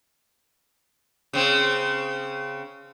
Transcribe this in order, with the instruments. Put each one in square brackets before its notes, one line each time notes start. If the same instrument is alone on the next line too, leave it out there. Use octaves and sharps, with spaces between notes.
[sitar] C#3 C4